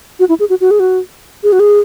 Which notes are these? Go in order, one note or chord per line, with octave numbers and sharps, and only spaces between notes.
F#4
E4
G#4
F#4
F#4
G#4
F#4
G#4
F#4
G#4